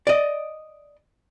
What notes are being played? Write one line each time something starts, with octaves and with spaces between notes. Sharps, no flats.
D5 D#5